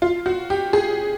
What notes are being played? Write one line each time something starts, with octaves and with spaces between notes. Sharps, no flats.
F4
F#4
G4
G#4